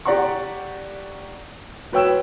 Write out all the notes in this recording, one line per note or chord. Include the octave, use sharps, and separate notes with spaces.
G4 D5 F#5 A#5 C#6
F#3 B4 C#5 G5 E6 E7